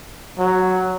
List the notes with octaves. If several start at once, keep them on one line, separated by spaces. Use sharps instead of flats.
F#3